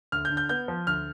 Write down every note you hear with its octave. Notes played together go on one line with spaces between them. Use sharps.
D2 F6
G6
D3
G6
B3 G6
F3
D2 F6